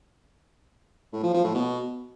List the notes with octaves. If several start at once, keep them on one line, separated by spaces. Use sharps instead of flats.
A2
F3
F3
A2
B2